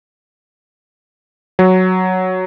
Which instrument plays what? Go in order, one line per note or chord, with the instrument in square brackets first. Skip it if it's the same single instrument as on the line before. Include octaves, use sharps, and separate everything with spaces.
[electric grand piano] F#3